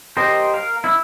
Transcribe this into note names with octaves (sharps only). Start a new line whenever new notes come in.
G4 A#4 C5 D#5
A#4 F5
E4 E6